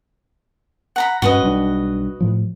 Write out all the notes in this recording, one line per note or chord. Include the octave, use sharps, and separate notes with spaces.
F#5 A#5 B5
G2 C#4 F#4 B4 D#5
B1 G3 D4
A2 F3